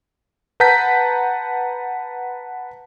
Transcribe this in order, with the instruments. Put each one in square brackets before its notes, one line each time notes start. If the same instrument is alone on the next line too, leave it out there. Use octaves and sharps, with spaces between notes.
[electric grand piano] B4 F#5 A5 A#5 G6 B6